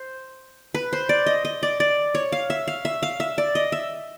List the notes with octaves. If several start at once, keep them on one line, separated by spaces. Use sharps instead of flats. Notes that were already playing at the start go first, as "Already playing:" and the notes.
Already playing: C5
B4
C5
D5
D#5
D#5
D5
D5
C#5
F5
E5
F5
E5
F5
E5
D5
D#5
E5